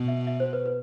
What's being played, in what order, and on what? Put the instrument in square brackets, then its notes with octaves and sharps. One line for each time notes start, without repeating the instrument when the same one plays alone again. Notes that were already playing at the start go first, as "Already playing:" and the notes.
Already playing: [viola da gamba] B2
[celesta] E5
E5
C5
B4
B4